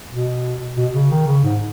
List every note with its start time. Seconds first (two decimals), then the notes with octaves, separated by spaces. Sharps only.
0.10 B2
0.76 B2
0.94 C#3
1.10 D#3
1.27 C#3
1.44 G#2